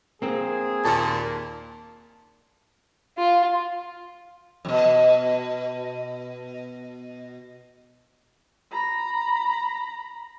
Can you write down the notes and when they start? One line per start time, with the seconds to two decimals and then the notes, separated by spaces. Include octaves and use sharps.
0.22 A#3 C4 G#4
0.85 D#2 A#2 A5
3.18 F4
4.65 F2 B2
8.72 A#5 B5